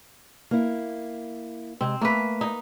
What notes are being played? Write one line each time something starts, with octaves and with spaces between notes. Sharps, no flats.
A#3 E4
C3 G#3 C4
A3 A#3 B4 A#5
D#4